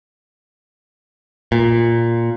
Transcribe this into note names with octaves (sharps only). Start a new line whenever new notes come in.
A#2